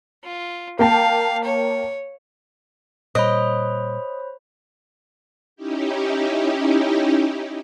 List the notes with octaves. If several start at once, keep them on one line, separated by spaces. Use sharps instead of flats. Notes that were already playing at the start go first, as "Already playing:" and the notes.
F4
A#3 F5 G5 A5
C#5
A#2 G3 C5 C#5 D#5 B5
C#4 D#4 E4 G4